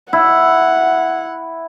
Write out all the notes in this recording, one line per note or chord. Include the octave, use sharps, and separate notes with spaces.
E4 F#5